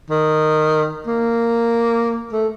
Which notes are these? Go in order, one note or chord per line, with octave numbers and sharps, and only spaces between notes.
D#3
A#3
A3